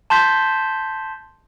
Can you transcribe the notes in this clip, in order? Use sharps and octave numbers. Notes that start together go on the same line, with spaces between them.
A5 C6 G6 B6